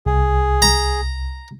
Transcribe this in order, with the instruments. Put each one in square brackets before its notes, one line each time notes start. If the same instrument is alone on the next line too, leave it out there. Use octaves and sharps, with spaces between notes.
[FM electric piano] C2 [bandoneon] G#4
[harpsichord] A#5